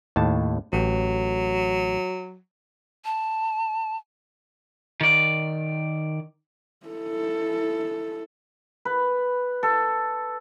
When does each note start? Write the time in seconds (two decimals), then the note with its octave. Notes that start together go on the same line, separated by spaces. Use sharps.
0.16 D#2 A2 A5
0.73 A1 F#3
3.05 A5
5.01 D#3 D5
6.87 E4 A4
8.85 B4
9.63 A4